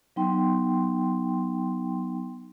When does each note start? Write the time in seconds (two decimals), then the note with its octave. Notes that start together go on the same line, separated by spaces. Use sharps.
0.16 F#3 B3 D#4 G5 C6